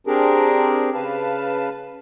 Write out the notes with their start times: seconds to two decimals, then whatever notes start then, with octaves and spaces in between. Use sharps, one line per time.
0.07 C4 D4 G4 G#4 A#4
0.94 C#3 B4 F5 A5